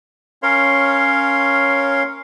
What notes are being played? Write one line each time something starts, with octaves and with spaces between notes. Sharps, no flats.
C#4 A#4 C#5 F5 C6